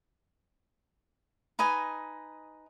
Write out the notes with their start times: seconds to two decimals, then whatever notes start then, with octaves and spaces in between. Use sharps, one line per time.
1.59 D#4 B4 D#5 G#5